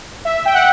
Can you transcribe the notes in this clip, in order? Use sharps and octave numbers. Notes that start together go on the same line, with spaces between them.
E5
G5
F#5